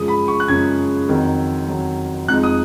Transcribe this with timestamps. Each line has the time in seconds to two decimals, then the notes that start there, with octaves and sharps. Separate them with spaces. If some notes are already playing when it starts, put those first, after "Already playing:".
Already playing: F#2 C#3 F3 G#3 D#6
0.08 B5
0.28 C#6
0.40 F#6
0.48 F#2 C#3 F3 G#3 G#6
1.09 F2 D#3 F#3
1.68 F2 D#3 F#3
2.28 F1 F2 F3 G#3 D#4 F#6
2.43 D#6